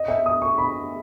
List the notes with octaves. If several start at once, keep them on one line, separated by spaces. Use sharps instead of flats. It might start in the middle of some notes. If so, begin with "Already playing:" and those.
Already playing: D#5
E5
D#6
C#6
B5